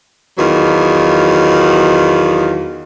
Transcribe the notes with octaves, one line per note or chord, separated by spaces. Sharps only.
E2 D#3 F#3 F4